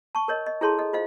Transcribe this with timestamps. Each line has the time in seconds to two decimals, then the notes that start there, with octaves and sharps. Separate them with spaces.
0.15 A5 C#6
0.28 A#4 C#5 D#5
0.46 D#5
0.61 E4 G#4 A4 C#5 A5 C6
0.79 A4 D#5
0.93 F4 C5 D#5 F5